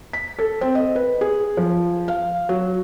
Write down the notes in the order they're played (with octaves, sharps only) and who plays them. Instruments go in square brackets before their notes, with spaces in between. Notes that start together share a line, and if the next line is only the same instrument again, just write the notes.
[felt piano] B6
A4
C4
D#5
B4
G#4
F3
F5
F#3